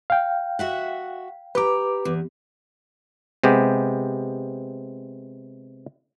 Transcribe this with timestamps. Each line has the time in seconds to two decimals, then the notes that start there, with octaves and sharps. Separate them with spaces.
0.10 F5 G5
0.59 F#4 E5 F#5
1.55 G4 B4 A#5 D6
2.05 E2
3.44 C3 G#3 B3 G4